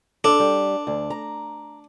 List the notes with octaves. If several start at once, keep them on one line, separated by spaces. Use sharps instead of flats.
D4 A4
G3
D2
A#5